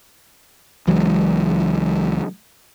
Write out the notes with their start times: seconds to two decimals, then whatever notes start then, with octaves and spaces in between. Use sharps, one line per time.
0.87 C#2 E3 F#3 G#3